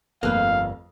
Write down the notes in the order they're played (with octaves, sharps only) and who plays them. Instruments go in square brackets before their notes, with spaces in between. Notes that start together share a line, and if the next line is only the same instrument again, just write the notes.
[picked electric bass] G1 [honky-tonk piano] F2 A3 [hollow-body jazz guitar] A#3 B4 [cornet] F5